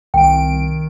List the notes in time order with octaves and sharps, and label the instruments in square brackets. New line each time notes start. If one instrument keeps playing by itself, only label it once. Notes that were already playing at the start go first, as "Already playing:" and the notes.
[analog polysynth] C2 D7 [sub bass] D#3 [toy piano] G5